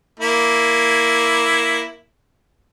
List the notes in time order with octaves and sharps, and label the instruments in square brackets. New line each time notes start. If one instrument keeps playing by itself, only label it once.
[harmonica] A#3 E4